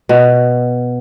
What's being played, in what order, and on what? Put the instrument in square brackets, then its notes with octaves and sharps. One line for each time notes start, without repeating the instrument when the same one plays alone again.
[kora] B2